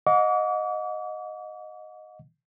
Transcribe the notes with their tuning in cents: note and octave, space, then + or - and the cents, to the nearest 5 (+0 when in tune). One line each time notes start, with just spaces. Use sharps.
D#5 +0 F#5 -40 D6 -40